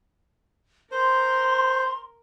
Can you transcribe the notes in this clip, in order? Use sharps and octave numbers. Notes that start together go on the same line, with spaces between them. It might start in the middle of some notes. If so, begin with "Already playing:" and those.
A#4 C5 C6